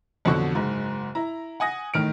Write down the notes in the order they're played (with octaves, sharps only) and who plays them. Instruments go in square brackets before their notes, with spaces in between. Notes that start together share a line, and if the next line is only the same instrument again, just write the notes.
[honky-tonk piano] A1 F2 B2 D3 F#4 C#6
F#1 G#2
E4 A#5
F#5 G#5 D#6 A#6
A2 D#3 F6 D7